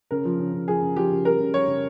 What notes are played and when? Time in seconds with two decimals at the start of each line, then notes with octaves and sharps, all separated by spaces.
0.11 C#3 A#4
0.25 F3
0.39 C#3
0.53 C#3
0.68 F3 G#4
0.82 C#3
0.96 F3 G4
1.12 C#3
1.25 G3 A#4
1.40 C#3
1.54 G3 C#5
1.68 C#3